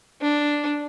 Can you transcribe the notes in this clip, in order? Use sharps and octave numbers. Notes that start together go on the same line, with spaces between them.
D4